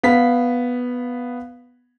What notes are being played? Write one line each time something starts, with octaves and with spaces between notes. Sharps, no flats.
B3 F5 B6